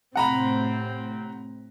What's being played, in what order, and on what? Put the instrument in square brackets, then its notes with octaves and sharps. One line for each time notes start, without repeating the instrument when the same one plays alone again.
[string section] A2 C3 C4 [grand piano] F#5 A#5 B5